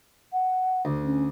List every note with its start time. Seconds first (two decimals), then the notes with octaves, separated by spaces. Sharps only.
0.33 F#5
0.85 D2
1.04 C#4